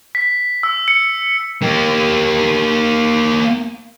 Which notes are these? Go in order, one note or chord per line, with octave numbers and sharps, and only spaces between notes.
B6
E6
C#7
A#3 G4